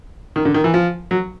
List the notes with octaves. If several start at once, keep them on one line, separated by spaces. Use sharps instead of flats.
D#3
D3
D#3
E3
F3
F#3